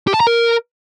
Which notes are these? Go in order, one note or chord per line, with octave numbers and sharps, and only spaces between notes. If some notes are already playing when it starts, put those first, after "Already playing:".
G4
A5
A#5
A#4